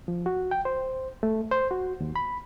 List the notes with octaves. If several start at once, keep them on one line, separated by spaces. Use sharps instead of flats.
F3
F#4
G5
C5
A3
C5
F#4
D#2
B5